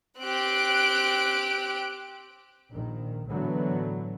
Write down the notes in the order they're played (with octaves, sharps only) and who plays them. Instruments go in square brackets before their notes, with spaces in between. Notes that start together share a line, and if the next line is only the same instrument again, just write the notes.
[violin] C4 G4 [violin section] F#6 D7
[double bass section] A#1 D#3
A2 D3 E3 F#3 A3 B3